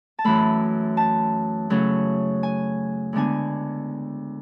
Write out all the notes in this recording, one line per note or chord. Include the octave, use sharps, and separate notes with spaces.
A5
F#2 E3 A3 B5
A5
C#3 F#3 A3 C#4 E4
G#5
D2 D3 G#3 B3 D4 G#5